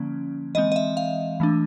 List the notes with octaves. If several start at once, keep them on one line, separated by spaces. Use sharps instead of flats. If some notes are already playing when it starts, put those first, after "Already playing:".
Already playing: D3 F3 A#3 C#4
E3 G#3 C4 D#5
D#5
E5
F5
E3 A3 D4